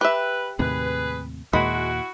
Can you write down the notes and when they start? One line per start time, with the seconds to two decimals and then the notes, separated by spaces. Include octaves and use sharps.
0.01 G4 B4 E5
0.59 D#2 A2 C3 G#4 B4
1.53 D#2 A#2 G#3 E4 F#4 B5